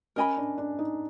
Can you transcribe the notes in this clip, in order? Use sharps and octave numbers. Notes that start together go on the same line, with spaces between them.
C#4 A#4 D#5 G#5 B5
D4
D4
D#4